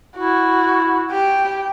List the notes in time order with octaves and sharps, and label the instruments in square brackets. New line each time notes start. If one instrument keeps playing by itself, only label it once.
[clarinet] E4 [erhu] F#4
[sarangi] G4 [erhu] G5